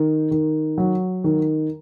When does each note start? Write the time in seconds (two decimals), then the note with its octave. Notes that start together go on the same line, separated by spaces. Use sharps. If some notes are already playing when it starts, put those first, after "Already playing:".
Already playing: D#3
0.31 D#3
0.78 F#3
1.24 D#3